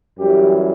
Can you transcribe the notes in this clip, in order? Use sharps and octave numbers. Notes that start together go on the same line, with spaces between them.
F#2 E3 G3 G4